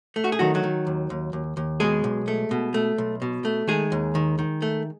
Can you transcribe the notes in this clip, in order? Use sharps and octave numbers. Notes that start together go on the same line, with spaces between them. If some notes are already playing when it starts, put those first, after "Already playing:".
A3
F#4
G#4
D#3 F#3 F#4
F#3 F#4
D#3
D#2
D#2
D#2
D#2
B2 G#3 G#4
B1
A3
B2
A3
B1
B2
A3
D#3 G#3 G#4
D#2
D#3
D#3
A3